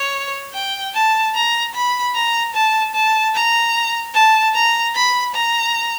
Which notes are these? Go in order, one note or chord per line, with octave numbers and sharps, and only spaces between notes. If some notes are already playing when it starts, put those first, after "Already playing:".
Already playing: C#5
G5
A5
A#5
B5
A#5
A5
A5
A#5
A5
A#5
B5
A#5